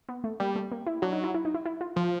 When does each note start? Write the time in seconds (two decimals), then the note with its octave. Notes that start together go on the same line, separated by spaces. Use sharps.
0.09 B3
0.24 A3
0.40 G3 A#3
0.55 A3
0.72 A#3
0.87 E4
1.02 F#3 D4
1.12 D#4
1.24 E4
1.34 E4
1.45 D#4
1.54 E4
1.66 E4
1.81 F4
1.96 F3